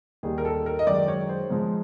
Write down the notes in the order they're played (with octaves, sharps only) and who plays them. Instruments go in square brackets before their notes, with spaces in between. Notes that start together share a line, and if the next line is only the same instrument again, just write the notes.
[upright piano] D#2 D#3 G3 G#4
A#4
A4
A#4
D#5
F#2 D#3 G#3 D5
C#5
C5
G#2 F3 G#3